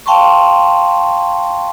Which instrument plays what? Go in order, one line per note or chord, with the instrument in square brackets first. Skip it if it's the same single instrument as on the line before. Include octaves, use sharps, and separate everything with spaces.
[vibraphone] F5 G5 A5 C6 C#6